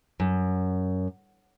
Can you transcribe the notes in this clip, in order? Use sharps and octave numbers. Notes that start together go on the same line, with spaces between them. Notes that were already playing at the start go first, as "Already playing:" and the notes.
F#2